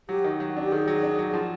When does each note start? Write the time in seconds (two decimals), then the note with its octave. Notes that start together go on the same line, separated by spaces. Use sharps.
0.09 F#3 G4
0.24 D#3
0.40 F#3
0.57 D4
0.63 G4
0.72 D#3 G#4
0.88 F#3
1.03 D4
1.18 F#3
1.34 F3